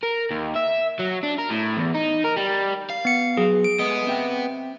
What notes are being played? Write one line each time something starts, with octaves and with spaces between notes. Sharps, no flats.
A#4
D#2
E5
F#3
D4
A#4
A2
E2
D#4
A#4
G3
F5
B3 C#7
F#3 B3 G#4
D7
G#3 A3 B3 D#5
C4 E5 G5